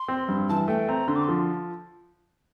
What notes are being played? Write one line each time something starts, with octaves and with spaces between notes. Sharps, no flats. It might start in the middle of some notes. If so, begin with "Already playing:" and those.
Already playing: C6
C4
G2
E3 A5
A3 G5
C4 A#5
D3 C6
D6
C6
F3